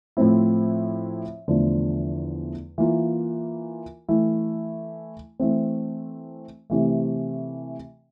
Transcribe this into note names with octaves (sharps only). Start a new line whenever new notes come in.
A2 F3 A3 C4 E4
E2 D3 F3 A3
E3 A#3 F4 A#4
E3 A3 E4
E3 A3 C4
C3 E3 A3